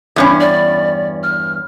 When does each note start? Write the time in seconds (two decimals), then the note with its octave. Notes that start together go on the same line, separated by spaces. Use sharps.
0.16 E2 G2 C#4
0.40 D5
1.23 F6